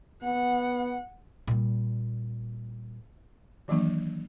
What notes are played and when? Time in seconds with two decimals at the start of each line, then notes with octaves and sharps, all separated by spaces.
0.23 B3 F#5
1.47 A#2 G3
3.68 D#3 E3 F#3 A#3 D4